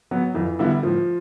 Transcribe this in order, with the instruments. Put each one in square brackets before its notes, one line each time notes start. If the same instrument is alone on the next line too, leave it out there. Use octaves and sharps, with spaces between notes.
[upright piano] F#3 B3
[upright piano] F2 [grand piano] E3
[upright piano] D3 G3 B3 E4
[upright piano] A2 [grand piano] F3